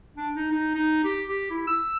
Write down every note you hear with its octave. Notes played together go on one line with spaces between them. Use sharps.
D4
D#4
D#4
D#4
G4
G4
E4
E6